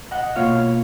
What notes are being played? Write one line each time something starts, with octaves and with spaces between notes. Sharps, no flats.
D#5 F#5
B2 A#3 F4 C#5 F5